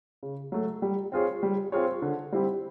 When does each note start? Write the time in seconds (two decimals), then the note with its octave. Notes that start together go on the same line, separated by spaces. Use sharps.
0.23 C#3
0.52 F#3 A3
0.82 G3
1.12 C4 F4 G#4 C#5
1.43 G3
1.72 C4 F4 G#4 C#5
2.02 D3
2.32 G3 C4 E4 G4